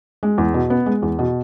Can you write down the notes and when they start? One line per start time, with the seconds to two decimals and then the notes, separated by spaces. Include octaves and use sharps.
0.23 G#3
0.38 E2
0.54 B2
0.70 B3
0.86 G#3
1.03 E2
1.19 B2